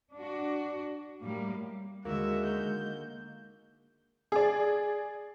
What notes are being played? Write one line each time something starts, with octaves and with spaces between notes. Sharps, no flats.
D4 F#4
A2 G3 A#3
D#2 D3 G#3 A#3 F#4 E5
F#4 E5 A#5 G6
G#4 D5